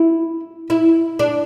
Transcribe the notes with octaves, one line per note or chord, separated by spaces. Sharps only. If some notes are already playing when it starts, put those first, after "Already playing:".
Already playing: E4
E4
D4